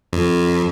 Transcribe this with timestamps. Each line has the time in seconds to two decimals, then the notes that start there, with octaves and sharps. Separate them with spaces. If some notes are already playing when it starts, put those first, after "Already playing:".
0.13 F2